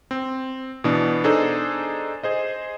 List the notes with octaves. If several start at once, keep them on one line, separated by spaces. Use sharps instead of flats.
C4
B2 E3 B3 D4
D4 D#4 G#4 A4 C5
G#4 C5 D#5